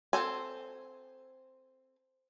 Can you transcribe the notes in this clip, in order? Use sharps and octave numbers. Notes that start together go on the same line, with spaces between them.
C4 A4 G#5